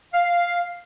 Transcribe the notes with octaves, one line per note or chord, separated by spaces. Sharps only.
F5